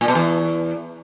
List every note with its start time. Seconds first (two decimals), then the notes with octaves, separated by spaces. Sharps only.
0.01 A#2
0.08 B2
0.15 E2